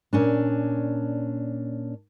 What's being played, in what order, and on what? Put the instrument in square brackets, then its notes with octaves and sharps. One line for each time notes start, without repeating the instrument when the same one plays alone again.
[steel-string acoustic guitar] A#2 C#4 D4